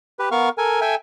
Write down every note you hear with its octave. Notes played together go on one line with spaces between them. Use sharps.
G4 B4
B3 A#4 F5 C#6 F6
A4 A#4 G#5
A4 E5 G5 G#5